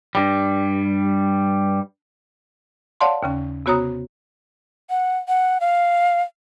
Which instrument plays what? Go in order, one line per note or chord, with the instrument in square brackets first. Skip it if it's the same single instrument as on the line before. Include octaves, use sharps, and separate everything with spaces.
[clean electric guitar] G2 G3
[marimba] C#5 D5 F5 F#5 A5 C6
D#2 C#3 C#4
C3 B3 F#4 C#5 A#5 D#6
[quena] F#5
F#5
F5